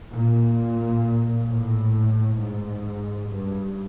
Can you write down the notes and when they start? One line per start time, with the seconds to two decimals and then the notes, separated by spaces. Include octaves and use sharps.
0.13 A#2
1.49 A2
2.39 G#2
3.30 G2